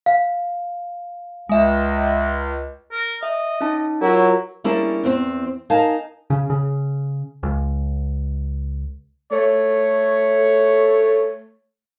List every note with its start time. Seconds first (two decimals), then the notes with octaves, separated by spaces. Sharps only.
0.06 F5
1.49 C#2 G#3 E5
2.92 A#4
3.23 D#5 E5
3.61 C#4 D#4 A5
4.02 F#3 E4 F4 A#4
4.64 G3 A#3 C#4 D4 E4 G#4
5.04 E2 C4
5.70 D#4 A#4 F5 G#5 A5
6.30 C#3
6.50 C#3
7.43 C#2
9.32 A3 C#5